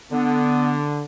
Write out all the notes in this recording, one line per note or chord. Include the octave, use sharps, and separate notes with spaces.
D3 B3